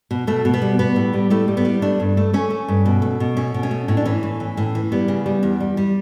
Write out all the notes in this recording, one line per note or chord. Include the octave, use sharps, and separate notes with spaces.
B2
B2 A3
B2
B3
G3
G3 B3
A2
G3
A2 A3
G3
B3
G3
A3 D4
G2
A3
A3 C#4
A3
G2
B2
A3
B2
A3 C#4
B2
C#4
A3
A2 C#4
D4
E3 C#4
A2
E3
A2
E3
G3 B3
C#3
G3
E2
G3
G3